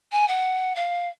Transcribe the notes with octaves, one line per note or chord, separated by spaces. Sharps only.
G#5
F#5
F5